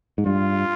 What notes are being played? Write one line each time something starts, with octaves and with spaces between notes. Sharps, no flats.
G#2
G2 F4